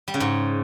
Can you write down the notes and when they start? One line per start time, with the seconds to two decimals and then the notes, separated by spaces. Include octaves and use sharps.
0.08 G3
0.14 C#3
0.20 G#2